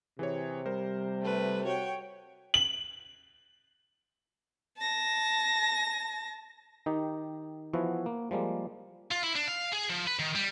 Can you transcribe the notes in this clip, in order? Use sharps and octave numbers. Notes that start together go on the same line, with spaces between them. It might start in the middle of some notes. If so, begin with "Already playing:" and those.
C3 E3 G#4 C#5
G3 A#4 C5
A3 B4
F#4 C#5 G5
F#7
A5 A#6
D#3 D#4 G4
E3 F3 B3 E4 F#4
A#3
F3 G3 G#3 A#3
F4
E4
D4
F5
G#4
F3
B4
D#3
G3